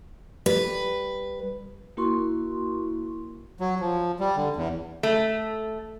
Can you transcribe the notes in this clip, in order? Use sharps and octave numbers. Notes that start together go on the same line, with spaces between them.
G3 B4
A#3 E4 F#4 A#4 C6 C#6
F#3
F3
G3
D3
E2
A3